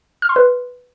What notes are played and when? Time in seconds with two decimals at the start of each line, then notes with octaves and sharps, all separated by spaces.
0.22 F6
0.29 C6
0.36 B4